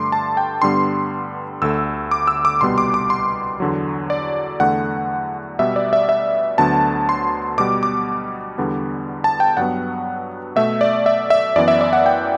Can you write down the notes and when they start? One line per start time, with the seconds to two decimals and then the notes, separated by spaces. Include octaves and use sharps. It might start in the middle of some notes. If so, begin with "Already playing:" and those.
Already playing: G2 D3 A3 C6 D6
0.12 A5
0.37 G5
0.62 G2 D3 G3 B3 C6
1.62 D2 D3 A3 E6
2.11 D6
2.27 E6
2.45 D6
2.61 C2 B2 G3 B3 C6
2.78 D6
2.94 D6
3.10 C6
3.60 E2 D3 F#3
4.10 D5
4.60 E2 D3 A3 F#5
5.59 B2 G3 B3 E5
5.76 D5
5.93 E5
6.09 E5
6.58 D2 D3 F#3 B3 A5
7.09 C6
7.58 B2 G3 B3 D6
7.83 D6
8.58 E2 D3 G3 B3
9.24 A5
9.40 G5
9.57 G2 F#3 B3 F#5
10.56 B2 A3 E5
10.81 D5
11.06 E5
11.30 E5
11.56 F#2 E3 B3 D5
11.68 E5
11.81 D5
11.93 F#5
12.06 G5